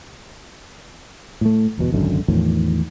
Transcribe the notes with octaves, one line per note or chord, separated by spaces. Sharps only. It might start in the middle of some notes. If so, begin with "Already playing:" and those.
A2 A3
G1 E2 B2
G#1 C#2 F#2 D3
E2 A2 D#3 F3